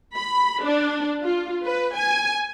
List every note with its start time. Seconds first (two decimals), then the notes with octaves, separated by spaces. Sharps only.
0.16 B5
0.64 D4
1.24 F4
1.66 B4
1.97 G#5